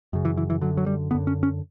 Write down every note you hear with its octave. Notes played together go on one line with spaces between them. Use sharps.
F#2 C#3
E3
E3
E3
F#2 D3 F#3
F#3
G3
F#2 D3 B3
C#4
C#4